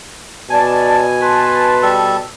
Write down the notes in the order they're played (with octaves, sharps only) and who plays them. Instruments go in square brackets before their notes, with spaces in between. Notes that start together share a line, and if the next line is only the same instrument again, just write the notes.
[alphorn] B2 [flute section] D5 A5 [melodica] G#5
[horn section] B4 C6 [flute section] A5
[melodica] G3 A4